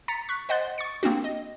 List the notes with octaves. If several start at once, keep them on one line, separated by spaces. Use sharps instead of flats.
A#5 A6 B6 C#7
C#6 F#6 B6
C5 D#5 F#5 C6 F#6 A6
C#6 A6 C#7
A#3 C4 D4 F#4
D#5